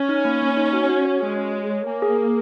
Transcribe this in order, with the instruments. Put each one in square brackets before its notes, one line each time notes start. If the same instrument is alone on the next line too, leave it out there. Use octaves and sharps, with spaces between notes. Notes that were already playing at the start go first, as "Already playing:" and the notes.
Already playing: [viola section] C#4
[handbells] D#4
A#3
A#3
D#4
F#4
F#4
C#5
[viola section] G#3 [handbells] F#4
[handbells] C#5
C#5
C#5
[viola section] A#3 [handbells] G#5
[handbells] G#4
G#4